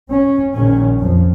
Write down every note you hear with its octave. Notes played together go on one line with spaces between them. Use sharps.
C#4
A#1 A#2 D#3 C#4
F2 F3